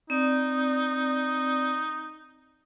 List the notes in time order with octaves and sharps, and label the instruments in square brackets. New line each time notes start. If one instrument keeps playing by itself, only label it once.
[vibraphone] C4 D5 [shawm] D#4